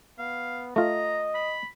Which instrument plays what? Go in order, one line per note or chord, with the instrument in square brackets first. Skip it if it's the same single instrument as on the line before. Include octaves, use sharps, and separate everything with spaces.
[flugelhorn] B3 [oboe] F5
[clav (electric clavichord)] A3 F4 [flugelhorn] D#5 [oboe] A#5
[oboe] B5